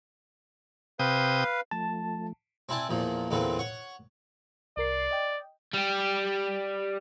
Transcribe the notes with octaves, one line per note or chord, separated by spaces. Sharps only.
C3 B4 F5 G5 D#6
F3 A3 A5
C4 D4 E4 G#5 A5
E2 A#2 F3
E2 A#2 D3 C4 B4
C#5 F#5
C2 A#4 D5 C7
D#5 G5
G3 G4